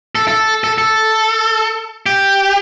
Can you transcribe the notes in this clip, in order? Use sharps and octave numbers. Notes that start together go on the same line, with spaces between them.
A4
A4
A4
A4
G4